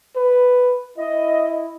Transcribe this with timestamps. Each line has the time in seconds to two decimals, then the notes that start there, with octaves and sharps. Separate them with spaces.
0.16 B4
0.98 E4 D#5